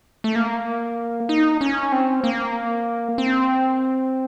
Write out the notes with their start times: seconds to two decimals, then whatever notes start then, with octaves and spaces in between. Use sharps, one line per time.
0.24 A3
0.35 A#3
1.29 D#4
1.61 C#4
1.92 C4
2.24 A#3
3.18 C4